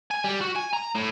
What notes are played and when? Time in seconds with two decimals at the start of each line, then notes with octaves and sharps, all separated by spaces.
0.11 G#5
0.24 G3
0.41 F#4
0.55 G#5
0.73 A#5
0.95 A2